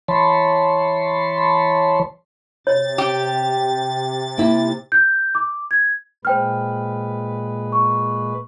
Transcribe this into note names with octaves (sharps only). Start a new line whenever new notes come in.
E3 C#5 A5 B5 C6
C3 C#5 A6
G4
A#3 E4
G6
D6
G#6
A#2 G#3 B4 C5 G5 F6
C#6